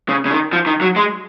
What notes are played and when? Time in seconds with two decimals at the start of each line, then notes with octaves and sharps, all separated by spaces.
0.09 C#3
0.26 C#3
0.31 D#3
0.53 F3
0.66 D#3
0.81 F#3
0.96 G#3